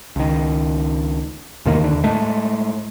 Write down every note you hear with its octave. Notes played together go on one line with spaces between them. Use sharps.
C#2 D#3
E2 C3 D#3 A#3
D#2 D3
A2 G#3 A3